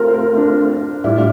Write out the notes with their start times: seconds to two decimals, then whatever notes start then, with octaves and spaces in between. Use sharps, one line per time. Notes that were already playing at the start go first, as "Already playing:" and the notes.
Already playing: A3 C4 F4 A#4
0.08 C5
0.14 A#4
0.37 D4
1.04 A2 G3 D4 E4 F4